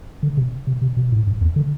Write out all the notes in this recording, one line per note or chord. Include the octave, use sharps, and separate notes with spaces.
D3
C3
C3
C3
B2
A2
G2
E2
D3